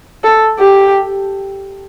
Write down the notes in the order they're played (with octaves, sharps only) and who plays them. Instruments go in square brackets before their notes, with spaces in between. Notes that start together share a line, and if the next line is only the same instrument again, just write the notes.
[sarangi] A4
G4